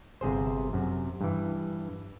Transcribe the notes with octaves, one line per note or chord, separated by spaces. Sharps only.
G1 C3 G#4 C5
F#2 C3
G2 E3